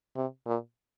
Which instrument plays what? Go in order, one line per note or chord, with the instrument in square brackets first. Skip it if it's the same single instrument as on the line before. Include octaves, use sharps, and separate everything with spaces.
[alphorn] C3
A#2